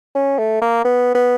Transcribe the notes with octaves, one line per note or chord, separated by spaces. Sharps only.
C#4
A3
A#3
B3
B3